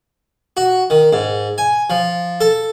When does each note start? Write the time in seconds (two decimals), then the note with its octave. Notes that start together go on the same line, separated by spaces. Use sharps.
0.57 F#4
0.90 D#3
1.13 G#2
1.58 G#5
1.90 F3
2.41 A4